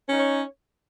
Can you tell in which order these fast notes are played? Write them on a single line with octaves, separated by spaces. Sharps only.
C#4 D#4 C#5